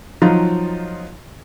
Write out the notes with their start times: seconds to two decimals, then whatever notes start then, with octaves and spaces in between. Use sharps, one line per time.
0.22 F3 F#3 D#4 F4